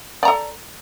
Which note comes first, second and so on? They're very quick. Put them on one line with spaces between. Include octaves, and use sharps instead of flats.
D5 A#5 A4